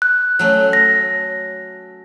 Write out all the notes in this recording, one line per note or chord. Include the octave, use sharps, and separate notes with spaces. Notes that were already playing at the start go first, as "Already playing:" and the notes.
F#6
F#3 A3 C#4
A#6